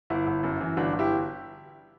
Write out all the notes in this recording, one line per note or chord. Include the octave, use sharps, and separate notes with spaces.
G1 E4
G1
F#2
E3
G1 D4 F#4
G1
E4 G4